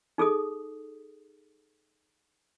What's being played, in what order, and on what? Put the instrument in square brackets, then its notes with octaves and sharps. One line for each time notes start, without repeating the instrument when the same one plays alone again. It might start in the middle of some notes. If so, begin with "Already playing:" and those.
[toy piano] D#4 G#4 A4 D#6